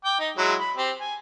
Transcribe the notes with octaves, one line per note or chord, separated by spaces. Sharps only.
G5 D6
D#4
F#3 G#3 E4
B5
C4 G4
G#5